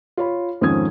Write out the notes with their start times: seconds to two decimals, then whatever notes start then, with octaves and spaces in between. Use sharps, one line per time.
0.17 F4 C#5 B5
0.61 F2 G#2 D#3 C#4 D#6 G#6